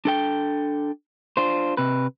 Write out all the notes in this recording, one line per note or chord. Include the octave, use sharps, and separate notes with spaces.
D4 A4 G5
D4 F4 C5
C3 B4